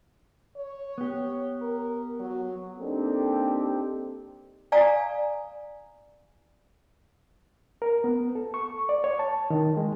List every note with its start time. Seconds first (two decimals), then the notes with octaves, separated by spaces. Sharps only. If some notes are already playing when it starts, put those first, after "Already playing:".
0.57 C#5
0.98 B3 G4
1.62 A#4
2.19 F#3
2.80 A#3 C4 D4 D#4 G4 A4
4.72 D5 F5 G#5 A#5 D#6
7.82 A#4
8.04 B3
8.35 A4
8.54 C#6
8.89 D5
9.04 C#5
9.19 A5
9.50 D#3
9.77 G#3